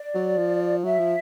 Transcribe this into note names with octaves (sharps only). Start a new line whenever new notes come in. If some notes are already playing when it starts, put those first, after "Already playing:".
Already playing: D5
F#3
F3
F#3 E5
F3